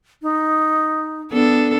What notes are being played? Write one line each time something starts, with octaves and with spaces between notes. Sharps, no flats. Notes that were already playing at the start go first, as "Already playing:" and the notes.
D#4
B3 D4 A4